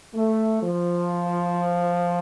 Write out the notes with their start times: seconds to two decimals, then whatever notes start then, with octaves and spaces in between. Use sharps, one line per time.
0.15 A3
0.62 F3